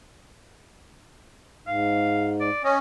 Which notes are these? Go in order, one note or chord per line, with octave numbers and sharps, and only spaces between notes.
G#2 F5
D5
C#4 D#5